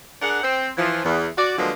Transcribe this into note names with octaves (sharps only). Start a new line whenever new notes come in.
D4 G#4 A#4 F#5
C4
E3 F3
E2
F#4 D5
D3 F3 F#3 G#3 A#3 B3